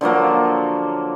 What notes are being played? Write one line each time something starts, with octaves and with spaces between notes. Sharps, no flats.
D3 F3 F#3 A#3